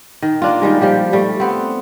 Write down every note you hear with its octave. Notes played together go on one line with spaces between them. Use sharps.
D#3
A#3 D4 F4
D#3 G3 G#3
F3 G3 G4
G3 A3
B3 C4